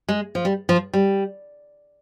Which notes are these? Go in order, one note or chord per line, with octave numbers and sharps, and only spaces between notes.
G#3
F3
G3
F3
G3